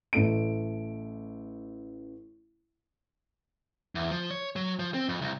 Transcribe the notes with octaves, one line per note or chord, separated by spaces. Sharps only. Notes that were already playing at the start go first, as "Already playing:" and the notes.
A1 A3 D7
E2
F3
C#5
F#3
F3
C4
F2
C2